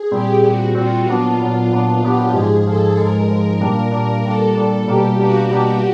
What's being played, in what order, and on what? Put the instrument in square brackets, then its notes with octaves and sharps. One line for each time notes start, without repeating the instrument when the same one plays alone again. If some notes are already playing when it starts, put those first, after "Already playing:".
Already playing: [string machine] G#4
[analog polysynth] A#2 G3 C4 [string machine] G4
[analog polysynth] A#2 G3 C4 [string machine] F#4
[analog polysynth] A#2 G3 C4 [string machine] F4
[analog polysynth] A#2 F#3 B3 D4 [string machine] F4
[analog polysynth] A#2 F#3 B3 D4
A#2 F#3 B3 D4
[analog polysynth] A#2 F#3 B3 D4 [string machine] G4
[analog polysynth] G#2 F3 G#3 [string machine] G#4
[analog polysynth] G#2 F3 G#3 [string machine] A4
[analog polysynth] G#2 F3 G#3 [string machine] A#4
[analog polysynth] G#2 F3 G#3
A#2 G3 A#3 D4
A#2 G3 A#3 D4
[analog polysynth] A#2 G3 A#3 D4 [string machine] A4
[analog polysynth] A#2 G3 A#3 D4 [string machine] A4
[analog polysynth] B2 G3 A#3 D4 [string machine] G4
[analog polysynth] B2 G3 A#3 D4 [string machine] F#4
[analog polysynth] B2 G3 A#3 D4